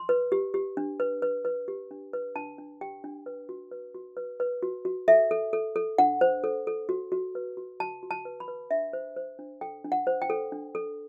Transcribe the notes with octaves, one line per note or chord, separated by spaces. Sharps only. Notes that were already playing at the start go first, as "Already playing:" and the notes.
Already playing: C6
B4
G4
G4
D4
B4
B4
B4
G4
D4
B4
D4 A5
D4
G4 G5
D4
B4
F#4
B4
F#4
B4
B4
F#4
F#4
A4 E5
A4
A4
A4
D4 F#5
C5
A4
A4
F#4
F#4
B4
F#4
F#4 A5
F#4
A5
B4
B5
B4
D4 E5
C5
C5
D4
A4 G5
D4
F#5
C5
G5
A4
D4
A4